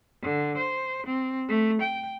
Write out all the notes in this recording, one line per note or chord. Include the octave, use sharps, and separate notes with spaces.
D3
C5
C4
A3
G5